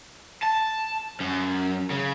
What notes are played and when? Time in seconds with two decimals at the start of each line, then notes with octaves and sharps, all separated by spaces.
0.42 A5
1.20 F#2
1.90 C#3